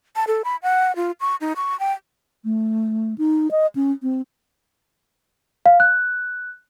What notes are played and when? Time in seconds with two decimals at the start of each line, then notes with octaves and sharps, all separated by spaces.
0.16 A5
0.27 A4
0.44 B5
0.63 F#5
0.96 F4
1.21 C#6
1.41 D#4
1.56 C#6
1.80 G5
2.44 A3
3.18 D#4
3.51 D#5
3.75 C#4
4.02 C4
5.66 F5
5.80 F#6